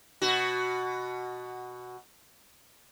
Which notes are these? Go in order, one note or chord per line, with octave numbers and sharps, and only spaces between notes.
B2 F#4